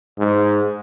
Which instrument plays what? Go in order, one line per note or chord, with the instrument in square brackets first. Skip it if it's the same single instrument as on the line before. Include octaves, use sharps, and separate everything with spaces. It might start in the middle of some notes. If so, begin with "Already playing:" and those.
[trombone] G#2